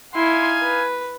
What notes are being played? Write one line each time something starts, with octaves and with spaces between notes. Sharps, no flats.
D#4 E4 F5 G#5 C6
B4